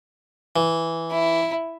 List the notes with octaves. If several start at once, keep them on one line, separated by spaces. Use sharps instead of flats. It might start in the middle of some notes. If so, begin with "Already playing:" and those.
E3
E4